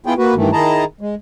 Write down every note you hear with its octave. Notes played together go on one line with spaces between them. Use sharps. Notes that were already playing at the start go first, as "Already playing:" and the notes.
B3 E4 F4 G#4 G5
A#3 F#4 B4
G2 D#3 E3 A3
D#3 E4 G#4 D#5 A5 A#5
G#3